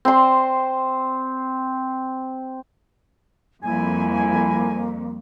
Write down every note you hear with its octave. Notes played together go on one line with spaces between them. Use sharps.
C4 C6
F2 G3 A#3 E4 G#5